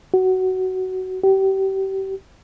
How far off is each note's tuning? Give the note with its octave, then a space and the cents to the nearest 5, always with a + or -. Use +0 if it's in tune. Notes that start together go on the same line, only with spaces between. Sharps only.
F#4 +15
G4 -30